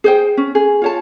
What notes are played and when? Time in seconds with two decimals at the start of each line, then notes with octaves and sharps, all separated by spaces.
0.04 G#4 C5 G5
0.37 C#4
0.55 G#4
0.82 F4 C#5 A5